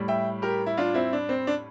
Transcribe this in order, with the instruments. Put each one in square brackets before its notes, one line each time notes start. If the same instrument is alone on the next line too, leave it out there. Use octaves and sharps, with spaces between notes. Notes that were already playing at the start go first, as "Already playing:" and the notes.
Already playing: [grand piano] A2 G3
E5 G5
G4 A#4
E4
D4 F4
C4 E4
D4
C4
D4